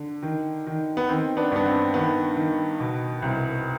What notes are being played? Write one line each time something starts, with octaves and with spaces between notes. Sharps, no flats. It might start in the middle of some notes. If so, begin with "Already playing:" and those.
Already playing: D3
D#3
D#3
B3
D#3 C4
B3 D4
G2 B3
C4
D#3 B3
D#3
B2
C2